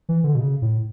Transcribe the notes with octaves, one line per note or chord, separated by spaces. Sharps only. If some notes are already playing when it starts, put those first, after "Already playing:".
E3
D3
B2
C#3
A2